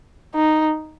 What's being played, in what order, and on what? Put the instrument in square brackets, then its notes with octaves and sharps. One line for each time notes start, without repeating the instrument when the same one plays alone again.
[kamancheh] D#4